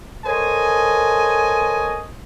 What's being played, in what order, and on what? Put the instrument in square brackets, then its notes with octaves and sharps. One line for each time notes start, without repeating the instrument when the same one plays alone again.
[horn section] A4 A#4 C5 C#5 D#5 G#5